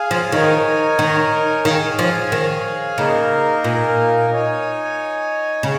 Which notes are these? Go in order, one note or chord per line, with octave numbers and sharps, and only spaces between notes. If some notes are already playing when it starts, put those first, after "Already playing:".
Already playing: G#4 F5 G#5
F3
D#3 D#4 A#4 C#5 G#5
D#3
D#3 G#4 C#5 F5 G#5
F3
D#3
C#3 A#3 D#4 A#4
A#2
D#4 C#5 G#5
C#3